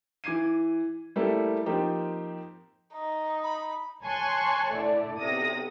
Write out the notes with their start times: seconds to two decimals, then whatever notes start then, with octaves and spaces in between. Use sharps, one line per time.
0.24 E3 D6 G#6 C7 D#7
1.16 G3 A3 A#3 E4
1.66 F3 A#3 C4 D#4 G4
2.94 D#4
3.43 B5
4.03 C#5 G#5 A5 C6 C#6 F#6
4.71 D3 A3 E4 D5
5.19 B1 C3 D#6 A#6